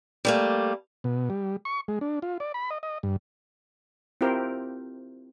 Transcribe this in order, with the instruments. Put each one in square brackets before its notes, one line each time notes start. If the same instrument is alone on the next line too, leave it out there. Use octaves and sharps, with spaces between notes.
[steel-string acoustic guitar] G3 A3 A#3
[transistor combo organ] B2
G3
C#6
G#3
D4
F4
D5
B5
D#5
D#5
G2
[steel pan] C4 E4 F4 G4 A#4 C5